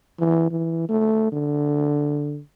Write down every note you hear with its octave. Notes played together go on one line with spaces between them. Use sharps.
E3
E3
A3
D3